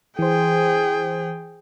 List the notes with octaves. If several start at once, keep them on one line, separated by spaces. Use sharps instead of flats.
E3 G#4 C5 G5